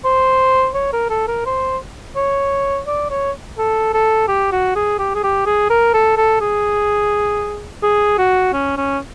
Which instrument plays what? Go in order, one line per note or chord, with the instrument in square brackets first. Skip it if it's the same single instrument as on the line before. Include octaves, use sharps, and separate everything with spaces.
[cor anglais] C5
C#5
A#4
A4
A#4
C5
C#5
D5
C#5
A4
A4
G4
F#4
G#4
G4
G#4
G4
G#4
A#4
A4
A4
G#4
G#4
F#4
C#4
C#4